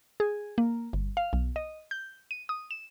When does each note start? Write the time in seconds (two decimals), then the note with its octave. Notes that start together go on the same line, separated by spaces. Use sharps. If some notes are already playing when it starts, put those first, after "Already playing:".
0.20 G#4
0.58 A#3
0.93 G1
1.17 F5
1.33 B1
1.56 D#5
1.91 G6
2.31 D#7
2.49 D#6
2.71 E7